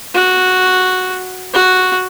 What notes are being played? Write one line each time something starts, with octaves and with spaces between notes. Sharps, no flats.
F#4
F#4